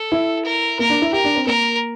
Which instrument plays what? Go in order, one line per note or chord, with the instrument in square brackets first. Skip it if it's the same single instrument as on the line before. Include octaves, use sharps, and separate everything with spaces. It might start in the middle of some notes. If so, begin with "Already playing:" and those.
Already playing: [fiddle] A4
[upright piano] E4
[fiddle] A#4
[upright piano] A#3 [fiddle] A#4
[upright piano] D4
E4
[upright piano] G4 [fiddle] A#4
[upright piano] D4
C4
[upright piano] A#3 [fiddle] A#4